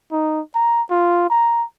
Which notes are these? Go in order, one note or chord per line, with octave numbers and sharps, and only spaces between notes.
D#4
A#5
F4
A#5